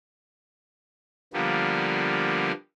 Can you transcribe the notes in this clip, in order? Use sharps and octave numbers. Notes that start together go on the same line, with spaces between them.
D3 F3 G3 A#3 B3